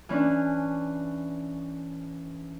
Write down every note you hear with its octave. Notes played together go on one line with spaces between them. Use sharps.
E3 C#4 D4